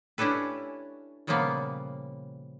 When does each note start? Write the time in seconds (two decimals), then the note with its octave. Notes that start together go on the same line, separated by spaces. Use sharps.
0.18 C#4 D4 E4 G4 A4 B4
1.27 A#2 C#3 F3 G3 A#3 B3